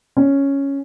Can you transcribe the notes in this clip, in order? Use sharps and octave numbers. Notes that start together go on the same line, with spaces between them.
C#4